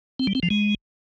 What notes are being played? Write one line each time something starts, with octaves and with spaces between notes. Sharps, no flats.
C4
G3
C4
F3
G#3